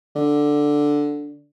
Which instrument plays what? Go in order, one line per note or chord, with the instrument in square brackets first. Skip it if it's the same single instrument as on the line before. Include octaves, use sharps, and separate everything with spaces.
[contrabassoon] D3